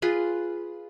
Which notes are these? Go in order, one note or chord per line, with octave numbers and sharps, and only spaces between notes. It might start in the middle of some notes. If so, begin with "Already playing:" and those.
F4 G#4 B4